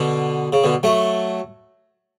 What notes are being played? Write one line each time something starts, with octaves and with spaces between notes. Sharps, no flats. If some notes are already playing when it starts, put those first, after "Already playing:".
Already playing: B2 D3
C#3
B2 D3
F#3 A3